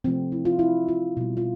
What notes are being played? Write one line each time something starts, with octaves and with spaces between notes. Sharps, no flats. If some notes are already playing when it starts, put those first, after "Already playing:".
C3 F3 A3 C4
E4
F4
E4
F4
B2 G3
F4